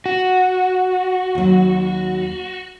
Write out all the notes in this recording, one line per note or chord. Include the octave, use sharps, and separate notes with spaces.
F#4
D#2 F#3